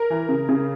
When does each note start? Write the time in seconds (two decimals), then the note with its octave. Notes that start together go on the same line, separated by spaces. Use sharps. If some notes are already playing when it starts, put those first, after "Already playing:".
Already playing: A#4
0.10 E3
0.29 C#3
0.49 C#3